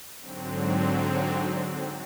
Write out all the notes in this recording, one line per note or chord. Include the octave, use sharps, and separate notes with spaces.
G#2 D3 F#3 C4